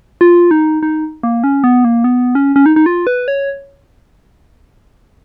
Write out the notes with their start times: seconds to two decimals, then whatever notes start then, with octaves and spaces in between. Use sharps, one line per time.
0.21 F4
0.51 D#4
0.83 D#4
1.23 A#3
1.44 C#4
1.64 B3
1.85 A#3
2.04 B3
2.35 C#4
2.56 C#4
2.66 D#4
2.76 D#4
2.86 F4
3.07 B4
3.28 C#5